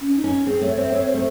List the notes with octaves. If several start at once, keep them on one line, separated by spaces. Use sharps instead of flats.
C#4
D#4
C#4
C4 G#4
A3 C#5
C4 C5
C4 C#5
C5
A3